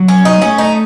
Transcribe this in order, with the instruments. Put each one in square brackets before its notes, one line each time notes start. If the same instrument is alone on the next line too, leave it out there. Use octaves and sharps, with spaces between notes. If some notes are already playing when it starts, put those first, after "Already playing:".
Already playing: [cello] F#3
[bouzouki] C#4
D#4
[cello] A3 [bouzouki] C#4
[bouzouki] D#4